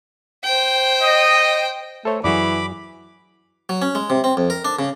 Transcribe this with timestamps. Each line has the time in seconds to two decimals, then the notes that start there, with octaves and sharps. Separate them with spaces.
0.44 C5 G5
1.02 D#5
2.05 A3 A4 C5 C#5
2.24 F#2 E3 F#3 F#4 G#4 D5 B5 D6
3.69 F#3
3.82 C#4
3.95 G#3
4.10 C3
4.24 C4
4.37 F2
4.50 A#4
4.65 D4
4.79 C#3